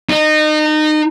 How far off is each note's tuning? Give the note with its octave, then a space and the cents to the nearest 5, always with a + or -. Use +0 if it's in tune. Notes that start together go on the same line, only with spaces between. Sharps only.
D#4 -25